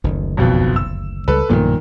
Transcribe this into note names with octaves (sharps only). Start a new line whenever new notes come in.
F#1 D2 D#3
B1 F2 B2
E6
C#2 G3 A4 B4
B1 G2 A#2 D#3 F3